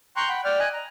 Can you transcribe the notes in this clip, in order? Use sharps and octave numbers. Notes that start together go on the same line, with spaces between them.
G5 A#5 C6 C#6 F#6 G6
F#5 G5 B5
D5 G5 F6
D#5 G#5 F#6
A#5